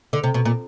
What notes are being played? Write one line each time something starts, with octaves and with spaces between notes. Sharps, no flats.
D3
C3
B2
A#2